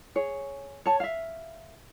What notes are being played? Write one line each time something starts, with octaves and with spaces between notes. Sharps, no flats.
G#4 C#5
C#5 A5
E5 F5